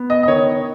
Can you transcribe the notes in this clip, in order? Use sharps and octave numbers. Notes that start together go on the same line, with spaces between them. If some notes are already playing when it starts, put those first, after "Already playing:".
Already playing: B3
D#5
D#5
D#3 C#5